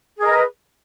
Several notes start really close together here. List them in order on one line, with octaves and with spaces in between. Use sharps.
G#4 A#4 D#5 B4